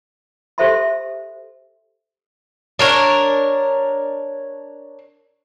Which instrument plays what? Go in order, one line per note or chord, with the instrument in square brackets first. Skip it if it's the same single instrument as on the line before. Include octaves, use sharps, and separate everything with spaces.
[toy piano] G4 A4 C5 E5 A5 C6
[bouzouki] D4 A#4 C#5